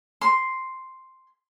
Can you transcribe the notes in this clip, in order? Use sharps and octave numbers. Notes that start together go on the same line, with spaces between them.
C6